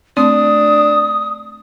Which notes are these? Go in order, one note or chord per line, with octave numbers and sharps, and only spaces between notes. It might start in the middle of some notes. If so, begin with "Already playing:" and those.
A3 C4 D4 D#6